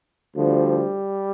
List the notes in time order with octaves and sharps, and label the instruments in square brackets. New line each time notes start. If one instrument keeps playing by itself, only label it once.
[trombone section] D2 D3 F3 G3